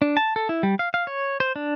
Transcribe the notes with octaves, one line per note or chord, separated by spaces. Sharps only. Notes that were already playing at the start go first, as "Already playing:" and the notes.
D4
A5
A4
E4
G3
F5
F5
C#5
C5
D4